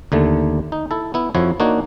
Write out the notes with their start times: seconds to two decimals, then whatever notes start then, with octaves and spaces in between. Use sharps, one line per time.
0.12 D#2 D3 A3
0.72 D#4
0.91 E4 A4
1.14 B3 E4
1.35 F2 F3 E4 F#4 C#5
1.60 A#3 D4 D#4 F#4 C#5